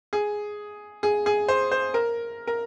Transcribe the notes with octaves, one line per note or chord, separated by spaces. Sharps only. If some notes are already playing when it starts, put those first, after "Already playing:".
G#4
G#4
G#4
C5
C5
A#4
A#4